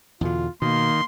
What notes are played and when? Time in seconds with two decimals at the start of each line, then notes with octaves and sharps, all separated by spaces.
0.21 E2 B2 D3 F4
0.62 B2 D#3 A#3 C6